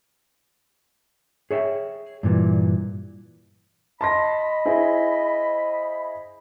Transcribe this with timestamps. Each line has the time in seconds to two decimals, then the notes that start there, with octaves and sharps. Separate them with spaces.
1.51 G#4 C#5 E5 G5
2.23 G2 A#2 E3
4.01 D#5 A5 B5 C6 A#6
4.65 E4 G#4 C5